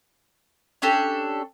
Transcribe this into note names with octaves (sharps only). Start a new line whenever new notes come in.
C#4 D4 G4 A4